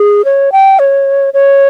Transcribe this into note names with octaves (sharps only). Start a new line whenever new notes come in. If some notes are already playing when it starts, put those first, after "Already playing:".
Already playing: G#4
C#5
G5
C#5
C#5